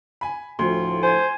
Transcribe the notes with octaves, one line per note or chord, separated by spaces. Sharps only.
G#5 B5
D2 A2 F3 C6
C5 G#5 G#6